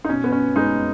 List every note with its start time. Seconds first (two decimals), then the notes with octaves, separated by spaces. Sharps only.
0.05 D#4
0.09 B2 C#4
0.24 B3
0.32 C#4
0.56 G#3 B3 D#4